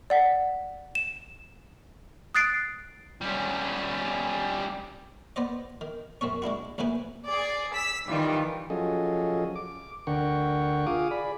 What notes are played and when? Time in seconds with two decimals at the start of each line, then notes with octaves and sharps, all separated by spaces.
0.10 D5 F#5 B6
0.95 E7
2.35 D#6 F#6 A6 C7 D7
3.21 G3 C#4
5.36 B3 C5 D5 D#5
5.81 D#3
6.21 F#2 C4 C#4 C#5
6.42 G#3 D4 E4 F#4
6.78 D#2 A2 C3 E4 B4 G#5
7.25 G#4 D5
7.74 E6 B6
8.08 D#3 E3 G3 F4
8.70 F3 F#3 C#4 G#4 A4 D#5
9.56 D6
10.07 D2 D3 A#4 F#5 G5 C#6
10.86 F4 G#4 F5 D6 D#6
11.11 G#4 D5 B5